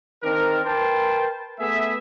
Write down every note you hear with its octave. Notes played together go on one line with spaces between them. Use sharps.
D#3 C4 D4 A#4
A#4 B4 G5 A5 C6
A3 B3 G#4 E5